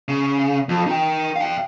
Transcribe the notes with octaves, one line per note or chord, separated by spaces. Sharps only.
C#3
F2
D#4 G5
F5 G5